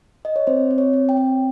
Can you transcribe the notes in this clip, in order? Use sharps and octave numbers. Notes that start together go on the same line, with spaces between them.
D#5
C#5
C4 C5
C4
C#5
C4
G5
C4